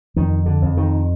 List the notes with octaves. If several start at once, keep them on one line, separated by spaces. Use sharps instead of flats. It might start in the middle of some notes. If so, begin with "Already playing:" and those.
F2 D#3
D3
F2
D#3